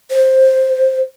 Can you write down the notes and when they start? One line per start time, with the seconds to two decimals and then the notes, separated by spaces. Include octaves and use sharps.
0.10 C5